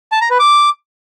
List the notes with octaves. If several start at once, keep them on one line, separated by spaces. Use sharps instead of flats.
A5
A#5
B4
D6